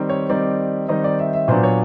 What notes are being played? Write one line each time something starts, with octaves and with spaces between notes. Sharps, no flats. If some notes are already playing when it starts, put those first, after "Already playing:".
Already playing: D#3 G3 C4 D#4
C#5
D#3 G3 C4 D#4 D5
D#3 G3 C4 D#4 D#5
D5
E5
E5
A#2 F#3 B3 D4 C5
C#5